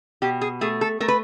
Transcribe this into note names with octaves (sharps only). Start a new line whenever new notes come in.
B2 G4
G#4
A3 G#4
A4
A3 A#4
B4